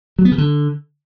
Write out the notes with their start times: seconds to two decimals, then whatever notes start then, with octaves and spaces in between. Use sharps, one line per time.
0.19 F#3
0.25 B3
0.32 C#3
0.38 D3